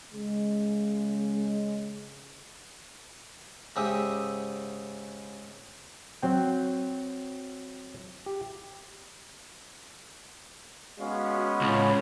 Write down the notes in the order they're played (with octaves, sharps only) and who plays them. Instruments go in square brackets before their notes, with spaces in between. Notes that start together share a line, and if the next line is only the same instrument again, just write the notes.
[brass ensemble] C#3 G#3
[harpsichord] G#2 C#3 D#4 G4 E5 D#6
[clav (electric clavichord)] F#3 C4 G5
G4
[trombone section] G#3 B3 C#4 [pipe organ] F#4 F5
[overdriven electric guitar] C#2 [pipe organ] A2 C#5 B5